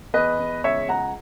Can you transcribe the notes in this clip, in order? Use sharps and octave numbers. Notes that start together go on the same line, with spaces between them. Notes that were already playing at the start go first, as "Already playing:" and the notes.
E2 B4 D#5
E2
C#2 C#5 E5
C#2 F#5 A#5